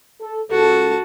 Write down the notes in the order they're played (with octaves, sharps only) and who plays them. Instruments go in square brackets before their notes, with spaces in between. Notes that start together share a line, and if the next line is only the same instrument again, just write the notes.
[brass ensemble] A4
[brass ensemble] C#2 A4 [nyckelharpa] F#4 A5